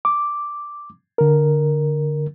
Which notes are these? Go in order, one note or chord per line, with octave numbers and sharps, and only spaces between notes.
D6
D3 A#4